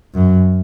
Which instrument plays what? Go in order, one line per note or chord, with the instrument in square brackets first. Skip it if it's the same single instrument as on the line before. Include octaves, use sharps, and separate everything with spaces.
[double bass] F#2